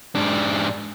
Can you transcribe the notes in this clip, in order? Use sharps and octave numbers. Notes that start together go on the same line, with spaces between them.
G#2 D4